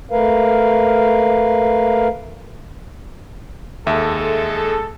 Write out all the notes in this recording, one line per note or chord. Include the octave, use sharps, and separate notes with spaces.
A3 A#4 B4 F5
D#2 G#3 A4 E5